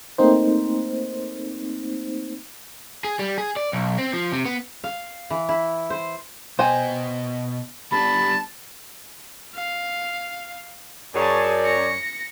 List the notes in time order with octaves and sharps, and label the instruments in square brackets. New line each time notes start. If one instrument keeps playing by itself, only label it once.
[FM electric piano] A3 A#3 C4 D#4 C5
[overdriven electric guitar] G#4
G3
G#4
D5
B1
C4
F3
C3
B3
[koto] F5
E3
E4
C5
[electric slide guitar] B2 D#5 [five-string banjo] C5 G5 G#5
[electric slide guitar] G3 B3 D4 [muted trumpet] A5 [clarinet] B5
[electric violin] F5
[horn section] F#2 C#5 D5 [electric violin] G#4 A5
[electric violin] A#6 C#7